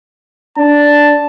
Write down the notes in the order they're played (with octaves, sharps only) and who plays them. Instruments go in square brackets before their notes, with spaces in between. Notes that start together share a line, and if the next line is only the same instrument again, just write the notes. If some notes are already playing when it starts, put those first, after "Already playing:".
[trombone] D4 [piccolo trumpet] A5